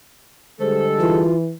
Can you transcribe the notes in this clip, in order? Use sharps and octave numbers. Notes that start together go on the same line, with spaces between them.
D3 G3 G#3 A4 C5
E3 F4